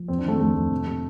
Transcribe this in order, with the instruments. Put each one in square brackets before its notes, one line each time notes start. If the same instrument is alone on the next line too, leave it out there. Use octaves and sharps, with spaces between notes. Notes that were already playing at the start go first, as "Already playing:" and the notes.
Already playing: [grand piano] F3
F2 C4
D4
D#3 A3 C4
F2 A3
F2
C3
C3